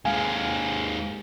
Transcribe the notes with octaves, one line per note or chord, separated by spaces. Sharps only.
D#2 G#3 F5 G#5